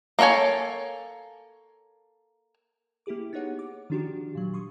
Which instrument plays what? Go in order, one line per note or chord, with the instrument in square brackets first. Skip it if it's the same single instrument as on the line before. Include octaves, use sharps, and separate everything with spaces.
[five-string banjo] A#3 F4 A4 C#5 G#5
[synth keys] A#3 E4 G4 G#4 D6
B3 D#4 G#4 C#5 F#5
D6
D#3 F3 D4 F#4 G4
A#2 F#3
C6 C#6 D#6